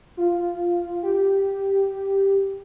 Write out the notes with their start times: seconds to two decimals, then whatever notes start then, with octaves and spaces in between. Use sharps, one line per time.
0.17 F4
1.03 G4